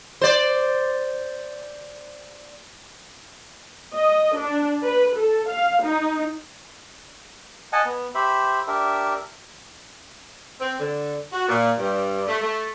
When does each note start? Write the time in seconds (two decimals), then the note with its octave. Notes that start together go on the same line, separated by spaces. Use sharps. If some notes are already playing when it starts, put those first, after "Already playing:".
0.21 C5 D5
3.94 D#5
4.38 D4
4.84 B4
5.16 A4
5.49 F5
5.83 D#4
7.73 D#5 F#5 G#5 A5
7.85 B3
8.15 G4 C5 E5 B5
8.68 D4 G4 A#4 E5
10.61 C4
10.79 D3
11.33 F#4
11.48 A#2
11.78 G2
12.28 A3
12.42 A3